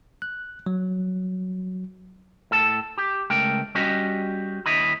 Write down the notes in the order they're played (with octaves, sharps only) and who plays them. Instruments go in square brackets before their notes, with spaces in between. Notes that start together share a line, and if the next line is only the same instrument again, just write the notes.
[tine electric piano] F#6
F#3
[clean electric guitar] A2 A4 A5
G4
C#2 A3 A#4 G5
G3 C#4 F#4 G4 D#5
D#2 E4 D#5 B5